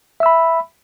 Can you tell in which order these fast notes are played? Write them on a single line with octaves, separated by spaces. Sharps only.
E5 E6 B5